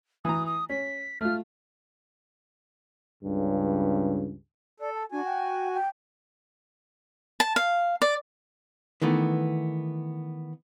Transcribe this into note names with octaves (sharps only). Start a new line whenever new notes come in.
E3 A#5 D#6
D#6
C#4 B6
A3 F4 F6
C#2 G2 C#3
A4 D5
A5
D4 F#4 G#5
G5
G5
A5
F5
D5
D#3 E3 A3 B3